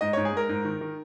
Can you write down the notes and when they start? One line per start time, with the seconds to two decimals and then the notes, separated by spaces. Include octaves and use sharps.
0.01 G#2 D#5
0.13 G#2 C#5
0.25 G#4
0.33 G#2 A#4
0.49 G#2
0.65 D#3
0.81 D#3